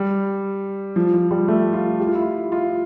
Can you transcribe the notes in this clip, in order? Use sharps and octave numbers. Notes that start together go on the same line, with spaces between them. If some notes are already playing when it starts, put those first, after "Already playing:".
Already playing: G3
F3
F3
G3
A3
F4
G4
F4
E4
F4
F4